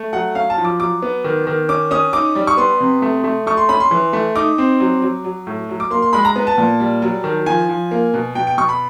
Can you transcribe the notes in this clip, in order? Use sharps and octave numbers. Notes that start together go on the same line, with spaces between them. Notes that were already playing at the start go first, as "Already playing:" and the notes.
Already playing: A3
F#3 F#5
C#4 F5
A5
F3
D6
F#3 D6
B3
D#3
D#3
C#4 D6
C#4 D#6
D#4 D6
G3
C#6
B3 C6
C3
A3
A3
A3 C#6
C6
C#4 B5
C6
E3
A3
D#4 D6
C4
F#3
F#3
F#3
A2
F#3
D6
A#3 C6
C6
G#3 B5
A#5
B3
A5
A#2
G3
F#3
D#3
F3 G#5
F3
A#3
B2
B2 G5
G5
B2 C#6
B5